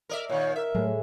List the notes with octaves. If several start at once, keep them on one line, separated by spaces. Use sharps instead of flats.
A#4 D5 E5
A#2 D#3 C#5
A#4 E5
A2 F#3 G#3 A3